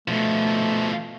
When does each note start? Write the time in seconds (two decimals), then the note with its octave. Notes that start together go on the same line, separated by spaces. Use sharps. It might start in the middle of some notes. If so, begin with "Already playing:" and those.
0.08 B2 F3 A3